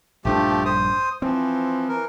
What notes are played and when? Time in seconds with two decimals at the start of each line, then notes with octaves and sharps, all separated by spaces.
0.25 A#1 G2 F3 A3 D4 G4
0.65 C5 D#6
1.22 E3 F3 C4
1.88 E3 A#4